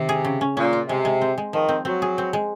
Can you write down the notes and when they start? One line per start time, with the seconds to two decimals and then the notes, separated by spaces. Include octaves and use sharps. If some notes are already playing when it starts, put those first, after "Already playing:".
Already playing: C3 D#3
0.09 G#4
0.25 C#3
0.41 C#4
0.57 A#2 C#4
0.73 F4
0.89 C3 G#3
1.05 G#3
1.21 C4
1.38 G#3
1.53 D#3 F3
1.69 C4
1.85 F#3 C4
2.02 G#4
2.18 C4
2.33 G#3